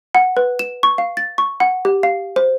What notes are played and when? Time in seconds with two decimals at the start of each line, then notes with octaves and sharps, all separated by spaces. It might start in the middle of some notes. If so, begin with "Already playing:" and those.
0.15 F#5
0.37 B4
0.59 E7
0.83 C#6
0.98 F5
1.17 A6
1.38 C#6
1.60 F#5
1.85 G4
2.03 F5
2.36 C5